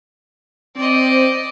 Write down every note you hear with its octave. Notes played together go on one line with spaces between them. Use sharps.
C4 D5 D#5